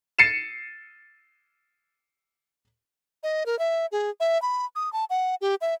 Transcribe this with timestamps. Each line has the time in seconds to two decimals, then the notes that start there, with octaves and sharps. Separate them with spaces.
0.18 A6 C7 C#7 D#7 E7
3.23 D#5
3.46 A#4
3.59 E5
3.92 G#4
4.20 E5
4.42 B5
4.76 D#6
4.93 A5
5.10 F#5
5.41 G4
5.61 E5